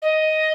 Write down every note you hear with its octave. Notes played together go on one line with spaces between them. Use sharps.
D#5